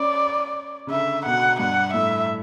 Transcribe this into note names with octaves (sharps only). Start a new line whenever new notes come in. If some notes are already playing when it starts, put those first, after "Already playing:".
Already playing: C#4 D5
C#3
D3 E5
B2 F#5
G2 F#5
A2 E5